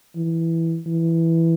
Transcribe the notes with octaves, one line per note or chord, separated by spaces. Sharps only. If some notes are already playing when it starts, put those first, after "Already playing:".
E3
E3